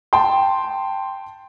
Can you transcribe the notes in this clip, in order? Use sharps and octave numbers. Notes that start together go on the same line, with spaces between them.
G5 A5 C6